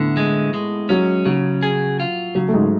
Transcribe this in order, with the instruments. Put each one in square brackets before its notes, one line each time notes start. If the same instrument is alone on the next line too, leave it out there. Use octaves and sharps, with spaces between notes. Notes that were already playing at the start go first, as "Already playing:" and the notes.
Already playing: [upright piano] A2 A3 B3 [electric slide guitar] D3
[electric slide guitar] G#3
G#3
[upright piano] F#3 [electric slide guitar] C#4
[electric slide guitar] C#3 [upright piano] F#3
[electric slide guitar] G#4
F4
[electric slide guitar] C#3 [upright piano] F#3
[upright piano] A3
G#2 G#3